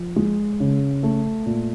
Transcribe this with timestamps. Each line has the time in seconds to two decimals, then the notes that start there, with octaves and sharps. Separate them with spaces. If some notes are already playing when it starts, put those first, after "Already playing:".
Already playing: F3
0.16 G#3
0.60 C#3
1.03 A3
1.46 A#2